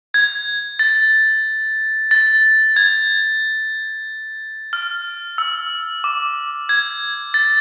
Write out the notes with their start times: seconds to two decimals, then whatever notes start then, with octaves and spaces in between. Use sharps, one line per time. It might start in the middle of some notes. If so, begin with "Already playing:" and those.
0.14 G#6
0.79 A6
2.11 A6
2.76 G#6
4.73 F6
5.38 E6
6.04 D6
6.69 G#6
7.34 A6